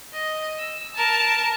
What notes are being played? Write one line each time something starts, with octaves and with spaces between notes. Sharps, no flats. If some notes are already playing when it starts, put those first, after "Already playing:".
D#5
E6
A#4 A5